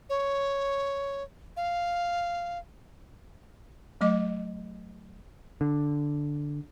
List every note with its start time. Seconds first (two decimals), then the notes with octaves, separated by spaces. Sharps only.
0.10 C#5
1.57 F5
4.01 F#3 A3 D#5 D6
5.61 D3